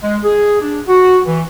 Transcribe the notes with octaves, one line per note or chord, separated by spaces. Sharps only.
G#3
G#4
D4
F#4
E3